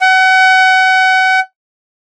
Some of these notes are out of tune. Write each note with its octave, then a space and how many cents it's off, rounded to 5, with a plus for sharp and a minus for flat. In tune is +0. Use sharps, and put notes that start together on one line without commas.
F#5 +30